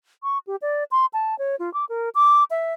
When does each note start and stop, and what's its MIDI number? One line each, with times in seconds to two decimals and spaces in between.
0.23 0.38 85
0.47 0.56 67
0.62 0.84 74
0.91 1.06 84
1.13 1.37 81
1.39 1.56 73
1.59 1.72 65
1.74 1.85 86
1.89 2.09 70
2.15 2.44 86
2.51 2.74 76